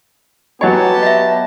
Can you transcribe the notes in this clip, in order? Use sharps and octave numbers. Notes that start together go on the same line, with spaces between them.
F#3 B3 G4 C#5 D#5 G#5 A5
D#5 E5